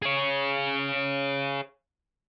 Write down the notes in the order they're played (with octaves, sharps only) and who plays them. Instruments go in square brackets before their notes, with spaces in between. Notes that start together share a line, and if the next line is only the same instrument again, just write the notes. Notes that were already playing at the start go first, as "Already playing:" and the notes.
[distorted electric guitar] G#4 C#5